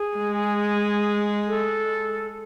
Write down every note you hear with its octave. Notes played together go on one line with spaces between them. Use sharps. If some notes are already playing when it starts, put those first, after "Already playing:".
Already playing: G#4
G#3
A4